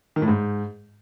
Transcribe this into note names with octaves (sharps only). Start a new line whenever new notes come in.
D#3
A2
G#2